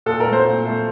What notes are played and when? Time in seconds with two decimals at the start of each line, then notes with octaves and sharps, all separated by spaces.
0.06 A#2 A4
0.20 A#4
0.26 A3
0.33 C5
0.45 A#2
0.65 A3